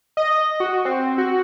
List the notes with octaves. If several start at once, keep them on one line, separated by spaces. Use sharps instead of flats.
D#5
F#4
C4
F#4